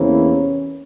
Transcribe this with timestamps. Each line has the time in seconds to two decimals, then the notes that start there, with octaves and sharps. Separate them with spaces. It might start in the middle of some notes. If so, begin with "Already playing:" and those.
Already playing: E2 C3 E3 A#3 C#4